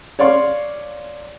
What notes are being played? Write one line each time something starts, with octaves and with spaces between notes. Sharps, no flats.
C#5 D5 F5 C6